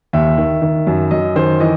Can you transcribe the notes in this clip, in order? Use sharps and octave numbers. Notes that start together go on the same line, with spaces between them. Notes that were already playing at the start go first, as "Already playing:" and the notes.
D#2 E5
D#3
D#3
F#2
F#2 D#5
D#3 C5
E3 D#5